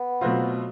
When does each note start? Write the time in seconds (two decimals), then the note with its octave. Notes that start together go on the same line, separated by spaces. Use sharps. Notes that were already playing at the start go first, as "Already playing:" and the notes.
Already playing: B3
0.21 B2 F#3 A3 C4 F4